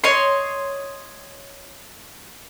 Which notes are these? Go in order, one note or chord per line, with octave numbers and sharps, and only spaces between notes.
C#5 D#5 C6